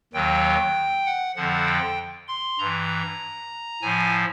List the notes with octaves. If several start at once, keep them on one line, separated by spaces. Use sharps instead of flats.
D#2 D#3 F#3 G5
F#5
F2 D3 F3 F#5
G5
C6
G2 E3 A#5
A2 F3 G#5